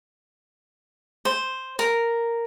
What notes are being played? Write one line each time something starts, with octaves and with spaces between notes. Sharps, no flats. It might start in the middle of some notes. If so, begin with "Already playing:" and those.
C5
A#4